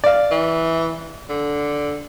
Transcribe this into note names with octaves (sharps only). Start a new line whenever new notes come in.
D5 F5
E3
D3